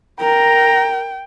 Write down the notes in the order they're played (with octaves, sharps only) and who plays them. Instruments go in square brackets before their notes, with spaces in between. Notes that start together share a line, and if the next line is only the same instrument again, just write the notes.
[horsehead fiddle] A#4 [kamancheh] G5 [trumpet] A#5